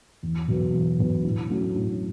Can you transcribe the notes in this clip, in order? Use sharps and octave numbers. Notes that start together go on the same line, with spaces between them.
E2
B2 F#3 B3
E2
B2 F#3 B3
A2
F#3 A3 C#4 F#4
A2